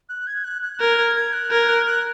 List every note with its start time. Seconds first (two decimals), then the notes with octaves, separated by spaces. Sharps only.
0.09 F#6
0.27 G#6
0.44 F#6
0.62 F#6
0.80 A#4 G#6
0.98 G#6
1.16 G#6
1.33 F#6
1.51 A#4 G#6
1.69 F#6
1.86 F#6